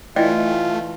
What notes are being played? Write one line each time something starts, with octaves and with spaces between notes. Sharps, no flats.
E3 A3 F4 D5 D#5 G5